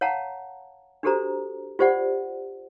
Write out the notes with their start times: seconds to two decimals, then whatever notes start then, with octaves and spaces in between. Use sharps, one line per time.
0.01 C#5 F5 F#5 A5 A#5
1.03 D4 F#4 G4 A4 C5 A#5
1.79 F4 G4 C5 D5 F#5